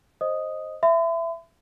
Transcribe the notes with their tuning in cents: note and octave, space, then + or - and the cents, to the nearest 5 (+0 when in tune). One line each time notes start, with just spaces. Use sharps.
C5 +15 D#5 +0 D#6 +0
E5 +15 B5 +45